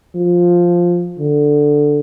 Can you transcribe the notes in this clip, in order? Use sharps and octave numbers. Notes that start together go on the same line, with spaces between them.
F3
D3